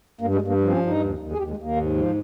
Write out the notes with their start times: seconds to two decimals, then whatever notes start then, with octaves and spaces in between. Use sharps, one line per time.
0.21 G2 A#3
0.35 G#3
0.41 G2
0.48 A#3
0.61 F3
0.69 C4
0.74 C#4
0.79 G2
0.86 D#4
0.99 D#2
1.18 D#2
1.32 G#4
1.38 D#2 G4
1.50 G#3
1.57 D#2
1.63 A#3
1.76 G#2
1.96 F3